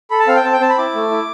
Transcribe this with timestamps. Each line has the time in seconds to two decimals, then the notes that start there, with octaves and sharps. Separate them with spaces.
0.10 A4 B5
0.20 A5
0.27 C4 F5
0.36 G5
0.44 C4 A5
0.53 G5
0.60 C4 A5
0.69 B5
0.78 E4 D6
0.94 A3
1.11 E4